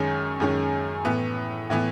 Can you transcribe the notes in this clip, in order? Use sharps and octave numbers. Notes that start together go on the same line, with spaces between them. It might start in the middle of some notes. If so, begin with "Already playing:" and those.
Already playing: F#2 D#3 G#3 C#4
F#2 D#3 G#3 C#4
A2 E3 B3
A2 E3 B3